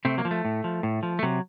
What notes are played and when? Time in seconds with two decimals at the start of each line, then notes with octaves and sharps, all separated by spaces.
0.05 C3 A3 C4
0.18 F#3 A#3
0.25 F3
0.31 A3
0.45 A2
0.64 F3
0.83 A2
1.03 F3
1.19 A3
1.23 C3 F#3